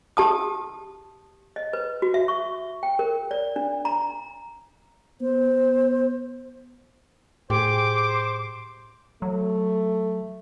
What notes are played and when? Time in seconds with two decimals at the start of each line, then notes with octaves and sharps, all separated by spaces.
0.17 G4 A5 D#6
1.56 D#5
1.73 B4
2.02 F#4
2.14 E5
2.28 C#6
2.83 G5
2.99 A#4
3.31 D5
3.56 D4
3.85 A#5
5.21 B3 C5
7.50 A2 G4 G#4 C5 D6
9.22 F#3 A3